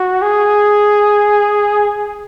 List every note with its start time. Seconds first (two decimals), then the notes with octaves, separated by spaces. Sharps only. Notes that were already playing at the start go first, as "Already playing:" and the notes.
Already playing: F#4
0.22 G#4